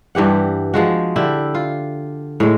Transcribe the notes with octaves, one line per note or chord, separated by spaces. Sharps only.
G2 E3 G4 F#5
F3 G#3 F#4
D3 E4 G4
F4
A2 G#3